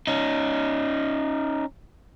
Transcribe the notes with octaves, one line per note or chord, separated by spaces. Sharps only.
C#4 D#4